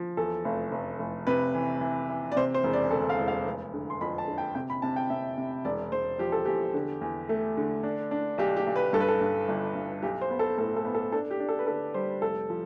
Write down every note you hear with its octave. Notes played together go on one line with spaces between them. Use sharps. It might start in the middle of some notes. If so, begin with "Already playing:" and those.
Already playing: F3
E2 A4
F1
F1
F1
C3 B4
E3
E3
E3
D5
C3 C5
C5
E1
D5
D2 A4
F5
E1
F5
F1
D3
C6
F2 B5
A5
D3
G5
C3 G5
B5
C3 A5
G5
C3 E5
C3
E1 D5
E1 C5
F3 G4
A4
E2 G4
D3
E2
A3
D3
D4
D4
B1 G4
G4
B1
B4
G2 A4
B4
A4
G2
G1
G2
B1 G4
C5
B3
A4
A2 A4
A4
B3
A4
D4 A4
G4
D4
A4
B4
D3 A4
G3 C5
F1 A4
F3